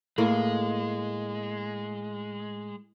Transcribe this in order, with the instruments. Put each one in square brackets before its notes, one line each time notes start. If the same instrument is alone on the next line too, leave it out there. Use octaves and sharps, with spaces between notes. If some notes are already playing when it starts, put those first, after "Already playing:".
[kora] A2 A#3 [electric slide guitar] G#3